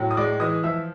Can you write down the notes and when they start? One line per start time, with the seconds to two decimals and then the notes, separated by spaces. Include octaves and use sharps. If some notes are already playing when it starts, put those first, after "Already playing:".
Already playing: A2 F#3
0.11 D#6
0.17 G#3 D5 D6
0.40 E3 D#5 D#6
0.63 F3 E5 E6